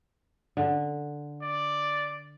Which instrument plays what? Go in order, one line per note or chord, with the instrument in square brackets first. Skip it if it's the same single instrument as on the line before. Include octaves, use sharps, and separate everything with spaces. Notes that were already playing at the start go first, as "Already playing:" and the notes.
[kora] D3
[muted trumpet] D5